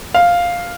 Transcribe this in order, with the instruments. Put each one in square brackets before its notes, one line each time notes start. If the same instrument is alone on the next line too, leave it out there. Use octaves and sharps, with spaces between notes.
[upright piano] F5